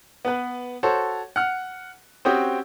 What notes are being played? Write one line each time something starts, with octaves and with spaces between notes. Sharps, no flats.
B3 B4
F#4 A4 C5 C#5
F#5 F6
C4 C#4 F#4 G4 G5 D#6